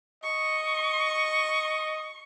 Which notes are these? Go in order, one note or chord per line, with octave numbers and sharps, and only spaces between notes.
D#5 C#6